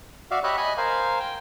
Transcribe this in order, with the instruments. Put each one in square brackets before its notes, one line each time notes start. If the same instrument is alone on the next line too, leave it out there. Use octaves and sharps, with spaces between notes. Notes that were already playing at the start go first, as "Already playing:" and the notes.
[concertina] F#4 D5 E5 F5
G4 C#5 D#5 E5 B5 F#6
D#5 G#5 B5
A#4 C5 F5 G#5
G5